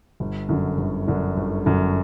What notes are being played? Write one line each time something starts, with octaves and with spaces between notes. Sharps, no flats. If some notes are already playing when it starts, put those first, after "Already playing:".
G1
F#2 D3
G1
F#2 D3
G1
F#2 D3